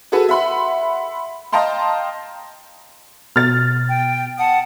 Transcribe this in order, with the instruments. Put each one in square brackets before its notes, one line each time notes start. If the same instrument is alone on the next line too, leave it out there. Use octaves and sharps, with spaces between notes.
[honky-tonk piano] F#4 G#4 A4 B4
E5 F#5 B5 C6
D#5 F5 G5 A5 A#5 C6
[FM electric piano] B2 [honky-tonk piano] F6 A6
[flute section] G5
F#5 A5 D#6